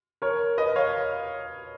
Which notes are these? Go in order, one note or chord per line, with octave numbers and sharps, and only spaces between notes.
A#4 C#5
B4 D#5
C#5 F5